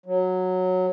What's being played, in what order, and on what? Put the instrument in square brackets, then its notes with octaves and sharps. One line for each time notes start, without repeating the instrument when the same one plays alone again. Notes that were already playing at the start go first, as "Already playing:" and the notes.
[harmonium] F#3